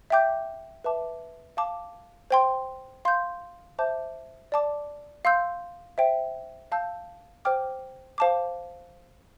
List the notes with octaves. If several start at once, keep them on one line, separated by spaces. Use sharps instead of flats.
E5 G5 D6 G6
B4 E5 A5 D6
F5 A5 D6
C5 G5 C6
F5 C6 G6
C5 E5 A5 D6 G6
D5 A5 D6
F5 C6 E6 G6
C5 E5 G5
F5 A5 E6 G6
C5 G5 D6 F6
C5 F5 A5 D6